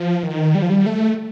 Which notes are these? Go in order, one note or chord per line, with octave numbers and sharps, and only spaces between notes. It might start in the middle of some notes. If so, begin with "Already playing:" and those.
Already playing: F3
D#3
G3
F3
G3
A3